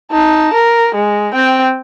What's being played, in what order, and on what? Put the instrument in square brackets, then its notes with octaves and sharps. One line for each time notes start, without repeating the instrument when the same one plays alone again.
[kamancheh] D#4 A5
A#4
G#3
C4 G5